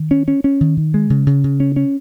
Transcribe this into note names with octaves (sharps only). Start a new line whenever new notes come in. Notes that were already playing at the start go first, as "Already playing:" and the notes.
Already playing: D#3
C#4
C#4
C#4
D#3
D#3
G#3
C#3
C#3
C#3
C#4
C#4